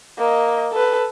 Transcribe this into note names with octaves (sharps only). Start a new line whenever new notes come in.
A#3 D#5
A4 B4